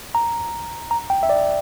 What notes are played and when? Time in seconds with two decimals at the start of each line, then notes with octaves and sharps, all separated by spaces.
0.15 A#5
0.91 A#5
1.10 G5
1.23 E5
1.30 D5